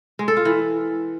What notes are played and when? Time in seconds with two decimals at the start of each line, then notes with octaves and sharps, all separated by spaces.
0.19 G#3
0.28 A4
0.37 F4
0.45 E3